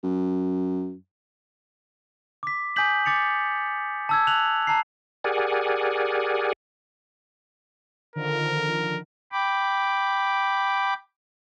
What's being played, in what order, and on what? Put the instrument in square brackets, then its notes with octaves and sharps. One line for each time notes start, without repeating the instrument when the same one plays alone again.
[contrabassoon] F#2
[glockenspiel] D6 B6
G#5 D6 D#6 G6 B6 F#7
D6 A6 C#7 F7
A5 E6 G#6
E6 F#6 F7 F#7
A5 A#5 C7
[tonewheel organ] G4 G#4 A#4 D5 F#5 G#5
[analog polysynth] D3 D#3 F3 [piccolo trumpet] A#4
[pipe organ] G5 B5 D6